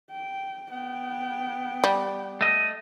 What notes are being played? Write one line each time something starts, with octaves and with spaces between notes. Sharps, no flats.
G5
B3 G5
G3
A3 D#5